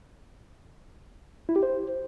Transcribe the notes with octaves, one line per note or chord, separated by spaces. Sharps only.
E4
G4
C5